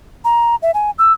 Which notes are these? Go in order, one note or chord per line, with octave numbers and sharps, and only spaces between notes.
A#5
E5
G#5
E6